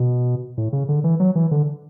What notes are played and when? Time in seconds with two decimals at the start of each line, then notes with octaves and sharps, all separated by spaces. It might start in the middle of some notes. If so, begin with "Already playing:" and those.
Already playing: B2
0.58 A2
0.73 C#3
0.89 D3
1.04 E3
1.20 F#3
1.35 E3
1.51 D3